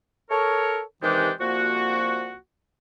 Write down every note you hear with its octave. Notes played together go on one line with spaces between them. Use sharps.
A4 A#4 C#5
C3 D#3 E3 G#3 D4 G4
C2 F3 A#3 F#4